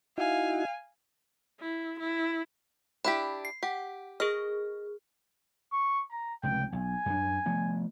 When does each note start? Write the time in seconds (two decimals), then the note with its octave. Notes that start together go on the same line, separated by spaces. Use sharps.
0.18 D#4 E4 F#4 F5 G#5
1.60 E4
2.00 E4
3.05 D4 E4 G4 B5
3.45 C7
3.63 G4 F#5
4.20 G#4 A#4 D#5 F6
5.72 C#6
6.11 A#5
6.43 F1 C#2 G5
6.72 B1 G#5
7.06 F#2 D4
7.46 F3 A3 B3